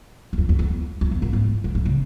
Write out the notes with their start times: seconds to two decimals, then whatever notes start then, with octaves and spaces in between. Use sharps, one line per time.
0.33 E2
0.38 F2
0.49 E2
0.59 E2
1.01 F2
1.11 F2
1.22 F#2
1.33 G#2
1.64 G#2
1.75 G2
1.85 C#3